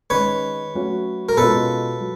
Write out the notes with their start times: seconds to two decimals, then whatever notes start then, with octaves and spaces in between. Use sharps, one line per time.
0.10 D#3 G#3 C#4 B4 C#5
0.74 F#3 A3 C#4 F#4
1.29 A#4
1.37 B2 G#3 C#4 F4 A4 B4
2.00 F#3